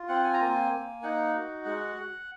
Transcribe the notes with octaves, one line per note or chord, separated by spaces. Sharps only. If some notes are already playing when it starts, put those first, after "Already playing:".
Already playing: F4
C4 F#5
G#5
A#5
A#3 G#5
A#3
D#4 F#5
F#4
G#3 F#5